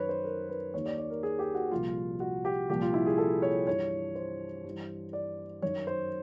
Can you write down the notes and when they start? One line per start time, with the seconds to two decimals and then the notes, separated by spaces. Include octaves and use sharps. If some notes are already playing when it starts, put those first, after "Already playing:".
Already playing: F#2 D#3 B4 C#5
0.09 C5
0.24 A#4
0.49 B4
0.73 D#2 D#3 C#5
0.86 D5
0.98 D5
1.10 A#4
1.23 G#4
1.39 G4
1.55 F#4
1.72 C2 A#2 F3 F4
2.20 F#4
2.45 G4
2.70 C2 A#2 F3 G4
2.82 F4
2.94 E4
3.06 G#4
3.18 A4
3.42 C#5
3.67 G2 E3 C#5
4.15 C5
4.64 G2
4.69 E3
5.13 D5
5.62 F#2 D#3 C#5
5.87 C5